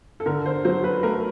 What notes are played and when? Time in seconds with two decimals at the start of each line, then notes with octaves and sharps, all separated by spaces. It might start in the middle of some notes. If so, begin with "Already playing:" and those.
0.20 A4
0.26 D3 A#4
0.46 C5
0.65 F#3 C5
0.84 B4
1.03 A3 A#4